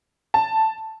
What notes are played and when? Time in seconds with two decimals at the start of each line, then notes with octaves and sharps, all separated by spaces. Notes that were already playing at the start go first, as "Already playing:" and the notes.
0.34 A5